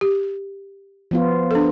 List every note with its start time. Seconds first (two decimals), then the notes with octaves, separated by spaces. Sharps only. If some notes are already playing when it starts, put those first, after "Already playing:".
0.01 G4
1.11 F3 B3 F4
1.51 D4 A4